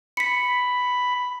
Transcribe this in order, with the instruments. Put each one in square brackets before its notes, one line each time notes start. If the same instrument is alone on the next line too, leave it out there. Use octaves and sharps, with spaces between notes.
[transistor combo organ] B5 [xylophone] B6 C#7